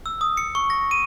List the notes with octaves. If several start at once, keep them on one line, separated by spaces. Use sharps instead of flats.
E6
D#6
C#7
C#6
A#6
D#7